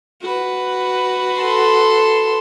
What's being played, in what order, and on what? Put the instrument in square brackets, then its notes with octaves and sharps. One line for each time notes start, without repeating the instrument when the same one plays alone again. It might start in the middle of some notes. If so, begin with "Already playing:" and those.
[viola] F#4 B4
[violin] A4 C6